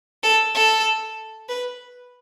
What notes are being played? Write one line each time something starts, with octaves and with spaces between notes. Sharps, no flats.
A4
A4
B4